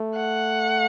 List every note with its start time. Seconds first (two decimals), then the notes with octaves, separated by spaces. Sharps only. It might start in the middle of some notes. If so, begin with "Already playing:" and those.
Already playing: A3
0.16 F#5